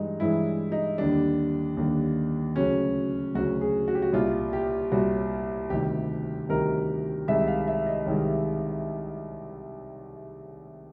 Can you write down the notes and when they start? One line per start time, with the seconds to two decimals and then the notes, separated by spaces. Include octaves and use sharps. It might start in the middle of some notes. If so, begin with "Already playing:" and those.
Already playing: G2 E3 G#3 D#4
0.20 G2 E3 G#3 E4
0.72 D#4
0.98 D#2 D3 G3 D4
1.77 D#2 D3 G3
2.56 D2 C#3 F#3 C#4
3.35 D2 C#3 F#3 F#4
3.61 G#4
3.88 F#4
3.95 G4
4.02 F#4
4.13 C2 A#2 G3 F4
4.53 G4
4.92 C2 A#2 G3 F#4
5.70 D2 C3 D#3 G3 G4
6.49 D2 C3 D#3 G3 A#4
7.28 C2 C3 D#3 G#3 E5
7.48 F5
7.68 E5
7.87 D#5
8.06 C2 C3 D#3 G#3